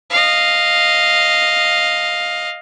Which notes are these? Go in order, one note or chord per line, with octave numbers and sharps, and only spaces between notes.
D#5 F5